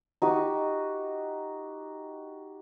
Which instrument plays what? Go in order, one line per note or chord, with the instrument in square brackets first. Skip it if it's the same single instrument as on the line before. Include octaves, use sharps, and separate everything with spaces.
[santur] D#4 F#4 G4